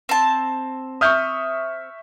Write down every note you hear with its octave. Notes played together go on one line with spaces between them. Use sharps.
C4 A5
E5 C#6 D#6 F6 G6